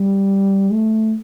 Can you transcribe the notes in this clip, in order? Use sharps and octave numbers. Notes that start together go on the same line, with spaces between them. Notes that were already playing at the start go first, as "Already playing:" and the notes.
Already playing: G3
A3